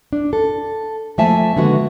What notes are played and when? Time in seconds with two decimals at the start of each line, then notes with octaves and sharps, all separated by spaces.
0.13 D4
0.33 A4
1.18 F3 A3 A#3 E5 G#5 A5
1.57 D3 D#3 G#3 A#3 B3 F#4